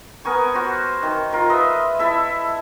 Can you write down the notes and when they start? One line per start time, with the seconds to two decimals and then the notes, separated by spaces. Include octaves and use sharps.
0.25 B3 A#4 G#5 C#6
0.54 F#4 C5
1.03 D#3
1.33 F4 A#4
1.50 B4 D#5 E5
1.99 E4 A4 E5